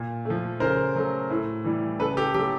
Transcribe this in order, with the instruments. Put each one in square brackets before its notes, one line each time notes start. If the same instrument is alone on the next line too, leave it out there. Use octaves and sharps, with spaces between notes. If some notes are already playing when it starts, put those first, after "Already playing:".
Already playing: [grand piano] A#2
F3 A3
C#3 A#4 C5
F#3 A3
A2
E3 G3
C#3 A4 B4
G4 A4
F#3 G4
A3